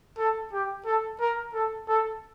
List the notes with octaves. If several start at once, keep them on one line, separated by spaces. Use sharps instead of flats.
A4
G4
A4
A#4
A4
A4